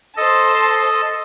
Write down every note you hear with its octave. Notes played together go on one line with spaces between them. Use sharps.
A4 C5 D#5 A5